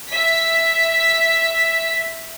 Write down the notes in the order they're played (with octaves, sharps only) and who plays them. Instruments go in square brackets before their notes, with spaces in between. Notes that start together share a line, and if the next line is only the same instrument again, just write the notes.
[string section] E5 B6